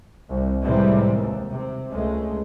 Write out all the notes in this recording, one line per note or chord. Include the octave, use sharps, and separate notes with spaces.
C2
A2 C3 E3 G3 G#3 A#3
D#2
C3
C#2 G#3 A3